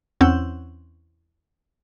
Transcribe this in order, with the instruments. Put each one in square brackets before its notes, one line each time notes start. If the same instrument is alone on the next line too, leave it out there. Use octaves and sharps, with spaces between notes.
[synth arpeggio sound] E2 C4 C#4 F#5 E6 G6